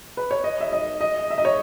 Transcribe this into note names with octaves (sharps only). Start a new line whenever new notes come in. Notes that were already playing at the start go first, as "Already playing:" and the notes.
B4
C#5
D#5
E5
D#5
D#5
E5
D#5
C#5